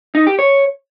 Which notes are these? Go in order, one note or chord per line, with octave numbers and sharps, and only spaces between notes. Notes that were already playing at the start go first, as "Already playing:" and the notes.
D#4
G4
C#5